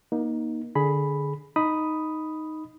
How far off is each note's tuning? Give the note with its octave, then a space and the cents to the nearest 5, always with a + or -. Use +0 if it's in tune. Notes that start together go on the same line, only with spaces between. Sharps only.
A#3 +30 D#4 +0
D3 +0 G#4 +10 B5 +0
D#4 +0 B5 +0 D#6 +0